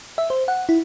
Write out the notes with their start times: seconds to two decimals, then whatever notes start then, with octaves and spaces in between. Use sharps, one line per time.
0.18 E5
0.30 C5
0.48 F#5
0.69 E4